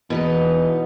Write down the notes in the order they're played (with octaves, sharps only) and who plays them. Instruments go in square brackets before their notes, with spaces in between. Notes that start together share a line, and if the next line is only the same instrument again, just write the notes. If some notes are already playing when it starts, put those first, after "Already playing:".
[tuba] E2 [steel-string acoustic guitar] B2 B3 D#4